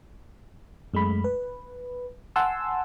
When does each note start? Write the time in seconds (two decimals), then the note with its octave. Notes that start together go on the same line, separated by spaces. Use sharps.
0.94 F#2 G#3 A3 B5
1.24 B4
2.36 F#5 G#5 A5 C6 E6